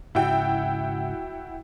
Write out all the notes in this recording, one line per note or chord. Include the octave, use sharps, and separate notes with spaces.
G#2 C#3 E4 F#4 G5